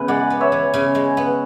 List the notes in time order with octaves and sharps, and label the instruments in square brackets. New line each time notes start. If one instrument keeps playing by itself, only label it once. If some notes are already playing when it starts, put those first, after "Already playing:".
Already playing: [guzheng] C#3 E3 B3 [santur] B4
[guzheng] G#3 [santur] D5 F#5
[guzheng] B3
[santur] C#5 E5
[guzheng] E3
C#3
G#3
B3